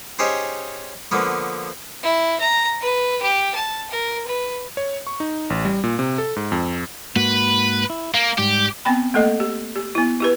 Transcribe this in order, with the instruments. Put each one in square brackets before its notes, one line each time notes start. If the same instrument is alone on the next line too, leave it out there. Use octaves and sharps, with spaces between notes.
[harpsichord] C#4 D#4 G4 G#4 C5
D3 F3 A#3 B3
[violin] E4
A#5
B4
G4
A5
A#4
B4
[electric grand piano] C#5
C#6
D#4
A1
G3
A#2
C3
A4
G#2
F2
[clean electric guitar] G#2 A#3 F#4 [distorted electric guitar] B4
[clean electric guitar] E4
[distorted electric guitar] A#3 [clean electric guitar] F5
[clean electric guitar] G#2 G3 [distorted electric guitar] G4
[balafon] B3 C4 G5 B5
A3 A#3 A4 D#5
G4
G4
B3 E4
E4 G4 B4